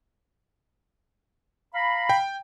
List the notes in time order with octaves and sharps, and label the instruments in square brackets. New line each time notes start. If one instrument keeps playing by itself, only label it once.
[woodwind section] F5 A#5 B5
[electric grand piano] G5